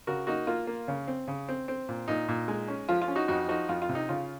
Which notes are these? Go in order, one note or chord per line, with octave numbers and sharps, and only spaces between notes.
C#3 F#4 A#4
A#3 D#4 F#4
A#3 F4
A#3
C#3
C4
C#3
C4
C4
A#2
A#2 D#4
A#2
G#3
C#4
F3 F4
F4
C#4
D#4 F#4
F2 D#4 F#4
F3 D#4 F#4
F2 F4
F4
C3
D#4
C#3 F4